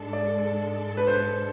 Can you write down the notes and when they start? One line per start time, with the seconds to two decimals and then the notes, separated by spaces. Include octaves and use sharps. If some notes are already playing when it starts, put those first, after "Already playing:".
Already playing: G#2 G#3 D4 A4
0.13 D5
0.97 B4
1.07 C5